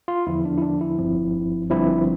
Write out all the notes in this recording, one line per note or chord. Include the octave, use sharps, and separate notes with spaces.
F4
E2 D3 F3 E4
D4
E4
D4
E4
G1 G2 F3 C4
G1 G2 F3 C4 E4